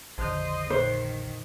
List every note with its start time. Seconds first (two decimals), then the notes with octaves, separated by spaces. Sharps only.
0.18 A#1 F2 D3 D#3 C5 D#5
0.70 A#2 D#3 C5 F#6